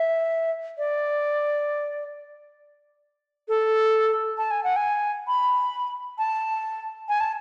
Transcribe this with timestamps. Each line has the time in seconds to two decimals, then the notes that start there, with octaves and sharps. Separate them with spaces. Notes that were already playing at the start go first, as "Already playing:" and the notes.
Already playing: E5
0.78 D5
3.48 A4
4.38 A5
4.51 G#5
4.64 F#5
4.76 G#5
5.28 B5
6.18 A5
7.09 G#5
7.20 A5